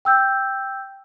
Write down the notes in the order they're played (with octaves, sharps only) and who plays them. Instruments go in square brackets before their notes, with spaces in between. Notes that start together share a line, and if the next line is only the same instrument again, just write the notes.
[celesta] G5 E6 G6